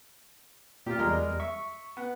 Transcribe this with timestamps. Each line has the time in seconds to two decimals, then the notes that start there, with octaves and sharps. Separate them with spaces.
0.86 A#2 F4 G4
0.98 E2 G3 G#3 A#4 D#5
1.40 E5 C#6
1.97 B3